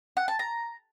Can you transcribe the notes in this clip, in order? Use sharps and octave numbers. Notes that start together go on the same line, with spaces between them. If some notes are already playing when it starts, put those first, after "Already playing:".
F#5
A5
A#5